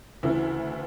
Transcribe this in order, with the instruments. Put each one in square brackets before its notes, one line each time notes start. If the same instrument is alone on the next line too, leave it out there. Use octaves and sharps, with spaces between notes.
[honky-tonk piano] D2 C#3 E3 E4